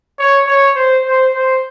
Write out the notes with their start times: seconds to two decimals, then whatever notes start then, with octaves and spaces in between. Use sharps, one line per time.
0.19 C#5
0.47 C#5
0.76 C5
1.05 C5
1.34 C5